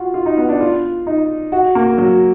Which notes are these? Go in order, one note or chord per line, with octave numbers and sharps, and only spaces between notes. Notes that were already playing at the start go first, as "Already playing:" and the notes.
Already playing: F4 F#4
F4
D#4
B3
D4
F4
D#4
F#4
A#3
F#3